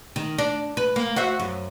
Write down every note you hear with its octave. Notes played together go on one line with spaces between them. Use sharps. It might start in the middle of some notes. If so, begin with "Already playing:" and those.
D#3
D4
B4
A#3
F#4 C5 E5
F#2